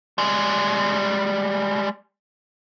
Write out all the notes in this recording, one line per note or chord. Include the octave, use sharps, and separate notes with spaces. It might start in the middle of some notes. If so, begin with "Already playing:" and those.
G3 G#3